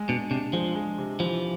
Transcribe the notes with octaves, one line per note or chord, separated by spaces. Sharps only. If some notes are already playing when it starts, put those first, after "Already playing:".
Already playing: G#3
B2 D4
C3 D4
F3 G#3
G#3
C3
E3 F3